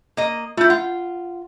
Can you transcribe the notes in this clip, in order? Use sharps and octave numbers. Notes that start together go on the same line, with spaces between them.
A#3 D#5
A3 E4 F4 G6
F4 F#5